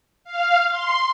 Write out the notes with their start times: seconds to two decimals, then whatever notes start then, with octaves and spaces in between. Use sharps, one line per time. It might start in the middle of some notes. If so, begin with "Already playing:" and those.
0.24 F5
0.69 C6